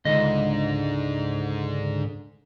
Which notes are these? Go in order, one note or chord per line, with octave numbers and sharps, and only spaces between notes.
C#2 G#2 D3 D#5